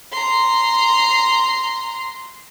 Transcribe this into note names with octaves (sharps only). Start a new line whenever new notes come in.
A#5 C6